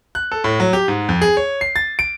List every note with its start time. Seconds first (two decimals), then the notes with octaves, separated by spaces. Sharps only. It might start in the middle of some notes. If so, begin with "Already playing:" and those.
0.15 F#6
0.32 A4
0.44 A2
0.60 F#3
0.73 G4
0.88 G#2
1.09 F2
1.22 G#4
1.37 C#5
1.61 C7
1.76 A6
1.99 D7